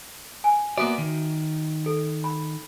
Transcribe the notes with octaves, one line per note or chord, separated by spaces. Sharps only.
G#5
A#3 B3 F#4 D5 E5 D#6
D#3
A4
B5